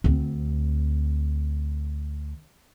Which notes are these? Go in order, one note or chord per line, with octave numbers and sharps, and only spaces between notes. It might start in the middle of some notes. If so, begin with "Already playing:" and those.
D2 C4